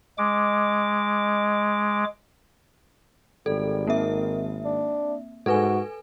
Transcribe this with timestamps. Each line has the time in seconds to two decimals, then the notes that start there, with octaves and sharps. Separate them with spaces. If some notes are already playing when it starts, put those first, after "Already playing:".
0.18 G#3 D6
3.46 G#1 G3 A4
3.87 D#3 A#3 C4 E5
4.65 D4
5.46 G#2 F#4 A4 B4 G#5